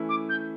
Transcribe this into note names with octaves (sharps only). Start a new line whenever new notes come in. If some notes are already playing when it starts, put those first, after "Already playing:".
Already playing: E3 A3 C#4 E4
D6
G6